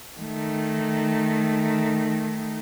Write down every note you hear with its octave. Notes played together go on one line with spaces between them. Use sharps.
D#3 A3